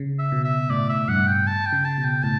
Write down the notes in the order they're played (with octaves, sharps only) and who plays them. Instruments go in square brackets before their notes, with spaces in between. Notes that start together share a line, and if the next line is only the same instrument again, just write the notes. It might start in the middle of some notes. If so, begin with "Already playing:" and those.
Already playing: [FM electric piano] C#3
[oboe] E5
[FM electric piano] B2
[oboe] E5
[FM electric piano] A2 [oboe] D5
[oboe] E5
[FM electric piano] G2 [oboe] F#5
[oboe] G5
A5
G5
[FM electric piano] C#3
[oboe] A5
[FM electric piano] B2
[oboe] G5
[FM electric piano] A2 [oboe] A5